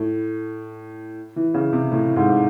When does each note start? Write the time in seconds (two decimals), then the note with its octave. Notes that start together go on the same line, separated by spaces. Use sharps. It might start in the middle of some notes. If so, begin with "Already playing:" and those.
Already playing: A2
1.36 E3
1.54 C#3
1.73 C3
1.92 A2
2.16 G#2